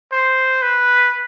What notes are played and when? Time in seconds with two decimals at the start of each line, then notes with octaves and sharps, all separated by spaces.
0.12 C5
0.62 B4